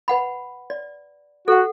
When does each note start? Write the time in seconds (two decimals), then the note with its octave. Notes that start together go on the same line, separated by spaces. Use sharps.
0.08 B4 F#5 B5
0.70 D5
1.48 F#4 A4 F#5